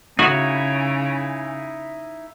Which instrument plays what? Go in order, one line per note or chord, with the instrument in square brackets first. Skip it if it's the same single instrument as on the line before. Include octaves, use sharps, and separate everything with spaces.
[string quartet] C#3 [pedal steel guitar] D#4 E4 C#5 [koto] F#4 [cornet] G#5